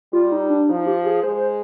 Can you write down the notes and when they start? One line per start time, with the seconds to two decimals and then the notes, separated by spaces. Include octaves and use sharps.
0.13 G3 F4
0.32 D#4
0.50 D4
0.69 F3 D#4
0.87 G4
1.06 G#4
1.23 G#3 C5